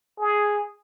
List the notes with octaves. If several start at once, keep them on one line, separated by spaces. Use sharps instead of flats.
G#4